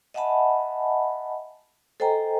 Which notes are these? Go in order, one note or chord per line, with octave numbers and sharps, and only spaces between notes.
D#5 E5 F#5 G#5 A5 B5
A4 C5 D#5 G5 G#5 A#5